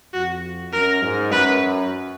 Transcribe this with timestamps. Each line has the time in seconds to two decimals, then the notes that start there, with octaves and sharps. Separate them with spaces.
0.13 F2 F#4
0.72 F#2 A#4
1.02 G#2
1.31 F#2 B4